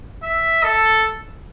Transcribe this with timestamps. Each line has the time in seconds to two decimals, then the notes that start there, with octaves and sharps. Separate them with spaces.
0.23 E5
0.64 A4